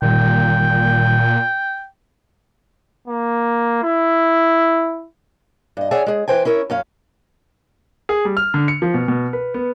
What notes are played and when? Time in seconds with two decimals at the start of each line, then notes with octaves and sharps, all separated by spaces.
0.02 G1 A#2 D#3 G3 G5
3.08 A#3
3.83 E4
5.77 G2 D#5
5.91 G#4 C#5 D5 E5 F#5 G#5
6.06 G#3 G#4
6.28 E3 B4 C5 G5 G#5
6.45 C#4 E4 A#4 C#5
6.70 F#2 C#4 F5
8.09 G#4
8.25 G3
8.37 F6
8.54 D3
8.68 C#7
8.82 F3
8.94 B2
9.08 B2
9.33 B4
9.54 B3